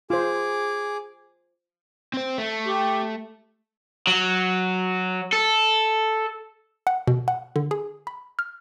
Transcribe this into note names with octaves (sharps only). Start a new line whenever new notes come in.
F4 G#4 C5 D6
C4 C5
A3
G4
F#3
A4
F#5
B2
F#5
D3
G#4
B5
F6